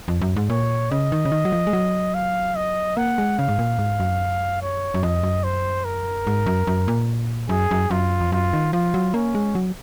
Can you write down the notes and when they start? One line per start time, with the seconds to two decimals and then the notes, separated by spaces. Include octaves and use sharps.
0.08 F2
0.21 F#2
0.36 G#2
0.50 A#2 C#5
0.91 C#3 D#5
1.12 D#3
1.25 C#3
1.32 D#3
1.45 F#3
1.52 F3
1.67 G#3
1.73 F#3
2.14 F5
2.56 D#5
2.97 A#3 F#5
3.18 G#3
3.38 C#3 F5
3.49 G#2
3.59 A#2
3.79 G#2
4.00 F#2
4.62 C#5
4.94 F#2
5.03 F2 D#5
5.23 F#2
5.44 C5
5.85 A#4
6.27 G#2
6.46 F#2
6.67 F#2
6.88 A#2
7.49 F#2 G#4
7.71 F#2
7.91 F#2 F4
8.21 F2
8.32 F#2 F4
8.53 D#3
8.73 F3 F4
8.94 F#3
9.14 A#3 C#4
9.35 G#3
9.55 F#3